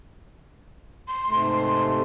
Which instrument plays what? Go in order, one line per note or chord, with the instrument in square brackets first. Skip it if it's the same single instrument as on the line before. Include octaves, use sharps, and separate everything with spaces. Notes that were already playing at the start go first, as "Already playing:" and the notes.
[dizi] C6
[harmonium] G#2 C3 A3